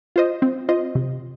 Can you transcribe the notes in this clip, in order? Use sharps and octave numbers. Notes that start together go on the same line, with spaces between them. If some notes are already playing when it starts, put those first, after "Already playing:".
F4 C5 D#5
C4
F4 C5 D#5
C3